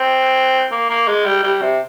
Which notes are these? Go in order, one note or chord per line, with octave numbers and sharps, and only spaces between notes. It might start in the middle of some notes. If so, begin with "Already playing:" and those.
Already playing: C4
A#3
A#3
G#3
G3
G3
C3